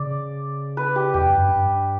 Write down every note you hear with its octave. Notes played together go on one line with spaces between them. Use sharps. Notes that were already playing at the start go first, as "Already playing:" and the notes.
Already playing: C#3 D5
B4
G4
E2 G4
F#2
G2
G2